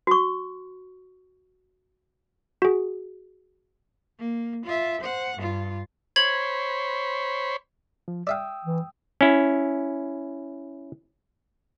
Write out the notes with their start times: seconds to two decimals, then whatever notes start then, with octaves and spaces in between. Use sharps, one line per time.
0.07 F#4 C#6
2.62 F#4 G#4
4.20 A#3
4.66 F4 E5
5.01 C5 F#5
5.37 G2 F4
6.16 C5 C#5 B5 G#6 F#7
8.08 F3
8.27 D5 E5 F5 G5 D#6 E6
8.65 E3
9.21 C#4 E4